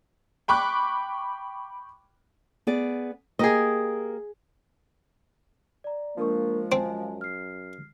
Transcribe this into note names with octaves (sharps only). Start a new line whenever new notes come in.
G5 B5 C#6 D6 F#6
B3 G#4 D5
A#3 G4 G#4 A#4 D#5
D5 A#5
F3 G#3 A#3 D4 A#4 C#6
F#2 C4 G#5 A5
F6 C7